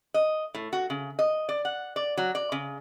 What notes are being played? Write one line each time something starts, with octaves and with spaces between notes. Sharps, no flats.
D#5
A2
F#4
C#3
D#5
D5
F#5
D5
F#3
D5
C#3